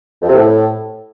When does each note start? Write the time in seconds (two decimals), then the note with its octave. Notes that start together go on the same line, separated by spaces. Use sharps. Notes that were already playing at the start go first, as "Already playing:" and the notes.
0.22 F2
0.29 C3
0.35 A2